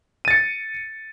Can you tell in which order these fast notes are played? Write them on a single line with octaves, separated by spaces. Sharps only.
D#7 A6 C#7